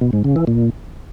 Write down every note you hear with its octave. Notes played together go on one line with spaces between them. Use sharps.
B2
G#2
C#3
E3
A#2